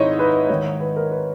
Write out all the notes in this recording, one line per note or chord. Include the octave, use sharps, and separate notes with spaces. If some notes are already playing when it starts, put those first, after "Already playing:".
Already playing: G#2 D#3 D#4 E4 C#5 D#5
B4
G#2 D#3 C#5
B4
A#4
B4